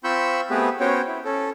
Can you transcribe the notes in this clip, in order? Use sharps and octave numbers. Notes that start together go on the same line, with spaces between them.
C4 F4 B5 C#6 E6 G6
A3 B3 C4 G4 G#4 B4
B3 C#4 F#4 C5 C#5 G5
E4
C#4 A4